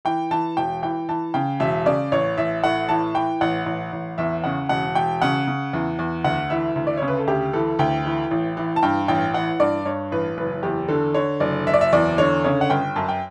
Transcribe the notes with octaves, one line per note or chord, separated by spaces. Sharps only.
E3 G5
E3 A5
E1 G5
E3 G5
E3 A5
C#3 G5
E1 E5
C#3 D5
A1 C#5
A1 E5
A2 F#5
E3 A5
E3 G5
A1 F#5
A1
A1
E2 E5
C#3 F#5
E1 F#5
E1 G5
C#3 F#5
C#3
E2
E2
D2 F#5
E3 E5
D2
D5
C#3 C#5
B4
A4
D2 G4
E3 A4
D2 G5
E3
A1
E3
A5
G2 G5
A1 G5
E3 F#5
G2 D5
G2 C#5
A1 B4
F#1 B4
E2 G4
D3 A4
D3 C#5
F#1 D5
F#1 E5
D5
E5
E2 D5
D3 C#5
C#3 C#5
F#5
G1 G5
F#2 A5
G5